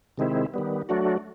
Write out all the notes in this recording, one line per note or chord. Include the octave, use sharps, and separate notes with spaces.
C3 D#3 G#3 C4 E4
D#3 G3 B3
F#3 A3 D4 F#4